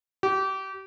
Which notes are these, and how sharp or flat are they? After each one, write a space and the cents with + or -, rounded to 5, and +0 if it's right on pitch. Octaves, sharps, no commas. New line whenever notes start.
G4 -30